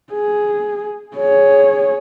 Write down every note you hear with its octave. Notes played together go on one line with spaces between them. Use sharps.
G#4
G#4 C#5